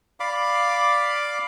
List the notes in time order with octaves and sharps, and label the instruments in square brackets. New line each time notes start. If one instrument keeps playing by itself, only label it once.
[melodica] D5 F5 B5 D6